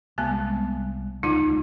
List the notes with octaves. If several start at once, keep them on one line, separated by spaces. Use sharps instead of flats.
C2 G#3 B3 G#5
D#1 C#2 G#3 D#4 F4